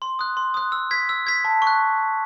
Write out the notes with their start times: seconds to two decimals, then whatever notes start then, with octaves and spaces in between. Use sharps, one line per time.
0.02 C6
0.19 D#6 F#6
0.37 C6
0.54 D#6 F#6
0.72 E6
0.91 G#6 B6
1.09 E6
1.27 G#6 B6
1.45 A5
1.62 C#6
1.67 F#6